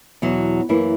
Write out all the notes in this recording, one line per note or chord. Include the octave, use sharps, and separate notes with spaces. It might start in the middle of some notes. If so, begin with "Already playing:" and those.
E2 B2 F#3
F#2 E3 A#3 E4